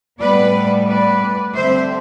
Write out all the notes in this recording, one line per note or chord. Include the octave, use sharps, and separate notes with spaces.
A2 G3 B3 B4 D5
B4 D5
D3 G3 C4 C5 E5